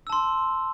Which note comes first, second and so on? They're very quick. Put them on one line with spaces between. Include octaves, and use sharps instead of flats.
E6 A5 C6